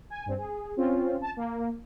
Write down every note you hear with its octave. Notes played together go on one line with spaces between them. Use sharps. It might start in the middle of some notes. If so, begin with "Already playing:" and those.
G#5
G2 C4
G#4
C4 C#4 F4
A5
A#3